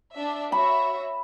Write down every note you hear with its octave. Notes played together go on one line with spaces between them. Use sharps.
D4 E5
F#4 C#5 E5 B5